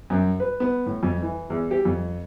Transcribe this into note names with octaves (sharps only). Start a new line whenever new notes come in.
F#2
B4
B3
A2
F2
E3
E2
G4
F2